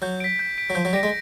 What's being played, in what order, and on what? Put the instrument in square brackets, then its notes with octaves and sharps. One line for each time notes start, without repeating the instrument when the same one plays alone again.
[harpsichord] F#3 [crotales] G6
[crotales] B6 D7
G6
B6 D7
[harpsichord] F#3
[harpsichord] F3 [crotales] G6
[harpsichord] F#3
[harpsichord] G3 [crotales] A#6 D7
[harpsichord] G#3